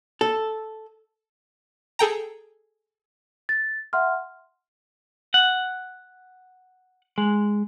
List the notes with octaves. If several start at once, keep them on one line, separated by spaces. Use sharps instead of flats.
A4
G#4 A4 G5 A#5
A6
E5 F#5 C6 F6
F#5
G#3